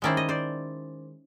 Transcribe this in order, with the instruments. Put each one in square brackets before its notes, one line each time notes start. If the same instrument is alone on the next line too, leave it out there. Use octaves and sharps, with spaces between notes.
[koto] D#3 G#3 C#4 E4 C5 D5
D#5
C5 D5